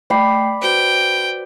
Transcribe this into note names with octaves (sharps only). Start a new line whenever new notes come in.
A3 D5 G5 B5 C7
F#4 B4 C5 G5